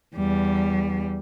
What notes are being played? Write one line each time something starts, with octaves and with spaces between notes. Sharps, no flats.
E2 G3